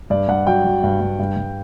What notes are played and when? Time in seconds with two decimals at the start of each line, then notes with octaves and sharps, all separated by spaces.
0.10 G2 D5
0.28 G2 F#5
0.47 F#3 G5
0.65 F#3
0.83 G2
1.01 G2
1.19 G2
1.37 G2